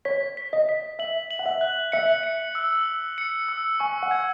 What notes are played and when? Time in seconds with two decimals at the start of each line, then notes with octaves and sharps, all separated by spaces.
0.05 C#5 B6
0.37 B6
0.53 D#5
0.69 B6
0.99 E5 F#7
1.31 F#7
1.39 F#5
1.46 E5
1.61 F#6
1.92 E5 C#7
2.23 C#7
2.55 E6
2.86 E6
3.18 C#7
3.49 E6
3.80 G#5 C#6
4.03 F#5
4.11 G#6